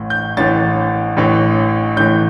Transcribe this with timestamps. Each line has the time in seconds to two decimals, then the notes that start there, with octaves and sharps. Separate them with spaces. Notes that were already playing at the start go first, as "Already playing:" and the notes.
Already playing: A1 A2 E3
0.10 G6
0.37 A1 A2 E3 A6
1.17 A1 A2 E3
1.96 A1 A2 E3 G6